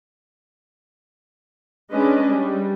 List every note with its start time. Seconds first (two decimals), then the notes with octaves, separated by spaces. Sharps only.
1.92 G#3 C#4 D4 B4 D#5
2.31 G3